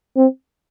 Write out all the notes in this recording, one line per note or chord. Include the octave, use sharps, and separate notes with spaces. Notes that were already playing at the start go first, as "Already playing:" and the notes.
C4